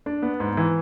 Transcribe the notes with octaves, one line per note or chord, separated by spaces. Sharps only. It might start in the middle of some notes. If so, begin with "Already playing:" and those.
D4
B3
G#2
E3